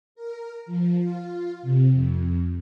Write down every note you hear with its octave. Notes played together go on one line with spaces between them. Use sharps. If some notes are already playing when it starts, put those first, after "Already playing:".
A#4
F3
F4
C3
F2